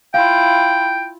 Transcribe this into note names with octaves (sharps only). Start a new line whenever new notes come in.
E4 F4 F5 G5